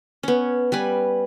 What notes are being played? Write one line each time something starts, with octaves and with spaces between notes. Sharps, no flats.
B3 C#4
G3 B4 G#5